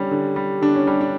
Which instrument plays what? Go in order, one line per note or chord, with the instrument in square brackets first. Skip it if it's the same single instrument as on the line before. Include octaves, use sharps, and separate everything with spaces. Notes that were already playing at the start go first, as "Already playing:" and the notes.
Already playing: [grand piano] D3 G3 C#4
D3
G3
D3 D4
C#4
G3 D4
D4